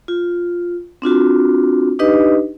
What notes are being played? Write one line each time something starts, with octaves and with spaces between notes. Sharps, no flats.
F4
C4 D4 F4 F#4
D4 D#4 G4 B4 D#5